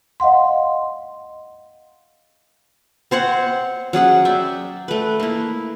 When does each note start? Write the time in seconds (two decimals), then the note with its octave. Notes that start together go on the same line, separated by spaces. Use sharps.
0.20 D#5 F5 F#5 C6
3.11 C4 C5 C#5 F#5
3.93 F#3 C#4 G#4 F#5
4.25 D5 E5 G5
4.88 A3 B4
5.20 A#3 E4